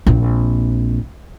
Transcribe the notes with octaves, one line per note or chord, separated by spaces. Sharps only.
A#1 C4